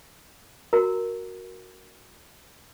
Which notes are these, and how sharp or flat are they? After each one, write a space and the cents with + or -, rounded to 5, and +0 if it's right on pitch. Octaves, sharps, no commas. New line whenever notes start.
F#4 +0 A#4 +0 A#5 -15